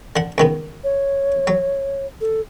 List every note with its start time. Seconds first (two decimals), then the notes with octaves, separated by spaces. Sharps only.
0.16 D3 F#5
0.38 C#2 D#3 B3
0.84 C#5
1.47 F#3
2.21 A4